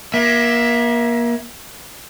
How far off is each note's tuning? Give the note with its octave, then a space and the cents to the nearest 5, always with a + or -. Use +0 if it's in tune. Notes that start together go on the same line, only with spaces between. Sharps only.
A#3 +30 E5 +0